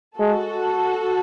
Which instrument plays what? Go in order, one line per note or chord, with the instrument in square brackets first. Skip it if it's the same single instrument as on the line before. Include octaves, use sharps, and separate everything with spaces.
[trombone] G#3 [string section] F#4 A4